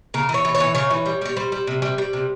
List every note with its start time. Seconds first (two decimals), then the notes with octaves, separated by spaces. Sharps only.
0.14 C#3 A#4
0.29 E3
0.34 C#5
0.45 E3
0.55 C#5
0.60 E3
0.75 C#3 C#5
0.90 E3
1.06 G3
1.21 G3 C#5
1.37 G3 C5
1.52 G3
1.67 C3
1.82 G3
1.98 G3
2.13 C3